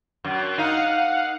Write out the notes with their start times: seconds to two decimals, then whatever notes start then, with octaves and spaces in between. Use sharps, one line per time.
0.24 F#2
0.58 D#4 F5 F#5